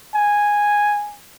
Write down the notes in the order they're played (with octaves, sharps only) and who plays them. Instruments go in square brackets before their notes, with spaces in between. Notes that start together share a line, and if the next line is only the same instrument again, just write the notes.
[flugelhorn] G#5